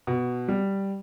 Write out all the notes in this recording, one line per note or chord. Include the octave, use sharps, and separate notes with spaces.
B2
G3